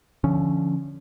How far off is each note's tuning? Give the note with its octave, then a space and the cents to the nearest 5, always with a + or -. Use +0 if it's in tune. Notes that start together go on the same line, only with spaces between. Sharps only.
D3 +0 F3 -20 C#4 +0